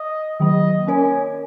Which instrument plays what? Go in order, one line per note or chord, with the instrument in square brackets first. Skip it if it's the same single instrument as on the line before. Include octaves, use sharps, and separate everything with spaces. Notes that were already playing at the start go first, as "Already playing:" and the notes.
Already playing: [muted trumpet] D#5
[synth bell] D#3 F#3 A#3 [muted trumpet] D#5
[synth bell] C#4 A#4 C#5 [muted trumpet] G#5